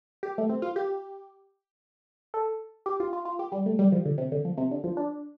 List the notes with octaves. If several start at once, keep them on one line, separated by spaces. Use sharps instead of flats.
G4
A3
C4
F4
G4
A4
G4
F4
F4
F4
G4
G3
A3
G3
F3
D3
C3
D3
F3
C3
D3
F3
D4